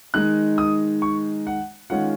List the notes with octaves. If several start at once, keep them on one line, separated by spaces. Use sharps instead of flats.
D#3 G#3 D#4 F#6
D#6
C#6
F#5
D#3 G#3 C#4 F4 F#5